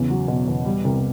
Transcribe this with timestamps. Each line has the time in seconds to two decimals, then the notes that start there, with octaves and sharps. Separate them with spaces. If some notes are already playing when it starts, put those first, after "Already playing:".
Already playing: E2 C#3
0.10 F#3
0.28 B2
0.48 E2
0.65 G3
0.84 C2